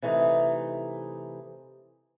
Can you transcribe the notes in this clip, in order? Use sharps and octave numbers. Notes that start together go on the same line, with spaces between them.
C3 E3 A3 D#4